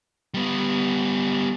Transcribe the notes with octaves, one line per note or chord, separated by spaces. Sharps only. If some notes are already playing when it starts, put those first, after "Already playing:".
G3 B3